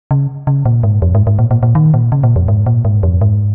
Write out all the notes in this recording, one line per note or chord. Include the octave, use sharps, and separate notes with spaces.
C#3
C#3
A#2
G#2
F2
G#2
G#2
A#2
A#2
A#2
D#3
A#2
C#3
A#2
F2
G#2
A#2
G#2
F2
G#2